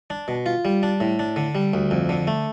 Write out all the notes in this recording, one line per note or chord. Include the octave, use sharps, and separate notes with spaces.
D4
B2
F4
G3
D4
A2
D4
D3
G3
D2
F2
D3
A3